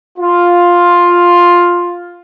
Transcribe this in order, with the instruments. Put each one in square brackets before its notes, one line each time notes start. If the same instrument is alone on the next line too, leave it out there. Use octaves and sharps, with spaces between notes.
[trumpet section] F4